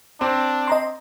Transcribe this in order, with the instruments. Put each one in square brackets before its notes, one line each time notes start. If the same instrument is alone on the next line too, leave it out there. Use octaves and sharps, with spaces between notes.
[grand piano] C4 [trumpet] D4
[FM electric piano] D#5 A#5 C6